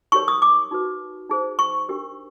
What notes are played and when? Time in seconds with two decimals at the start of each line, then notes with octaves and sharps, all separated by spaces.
0.12 D#4 G4 A#4 C#5 C#6
0.28 D#6
0.42 D6
0.71 D#4 F#4 B4
1.30 D#4 G#4 C5
1.59 C#6
1.89 D4 G4 A#4